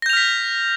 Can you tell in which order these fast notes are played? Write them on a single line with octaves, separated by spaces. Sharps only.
A#6 G6 F7 F6 B6